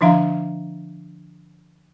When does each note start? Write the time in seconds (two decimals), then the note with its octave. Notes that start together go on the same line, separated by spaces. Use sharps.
0.01 D3 F3 D4 E5 F5 A#5